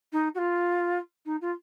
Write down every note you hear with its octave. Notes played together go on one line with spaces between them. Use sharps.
D#4
F#4
F4
D#4
F4